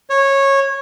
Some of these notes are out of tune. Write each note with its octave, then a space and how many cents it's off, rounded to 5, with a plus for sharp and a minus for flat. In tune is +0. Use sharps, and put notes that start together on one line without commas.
C#5 -15